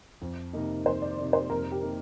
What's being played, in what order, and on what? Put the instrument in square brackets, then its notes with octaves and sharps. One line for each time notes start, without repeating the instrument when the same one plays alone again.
[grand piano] F2
C3 D#3 A#3 D#4
[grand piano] F2 [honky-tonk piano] C5
[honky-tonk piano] D5
[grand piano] C3 D#3 A#3 D#4
[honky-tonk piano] C5
[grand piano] F2 [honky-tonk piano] A#4
[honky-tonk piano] G4
[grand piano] C3 D#3 A#3 D#4